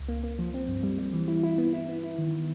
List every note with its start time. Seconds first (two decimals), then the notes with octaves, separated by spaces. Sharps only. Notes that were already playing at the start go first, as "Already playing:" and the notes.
Already playing: C#2
0.08 A#3
0.23 A#3
0.39 F3
0.54 C4
0.68 G2
0.83 G3
0.99 G3
1.13 E3
1.28 E4
1.43 E4
1.58 B3
1.73 E4
1.89 B3
2.03 E4
2.18 D#3